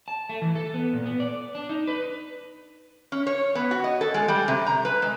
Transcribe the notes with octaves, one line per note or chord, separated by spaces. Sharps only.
A5
A3
E3
A4
B3
A#2
B3
D5
D4
D#4
B4
C#4
C#5
B3
F#4
D#5
A4
G#3
G3
C3
A#5
B4
G#3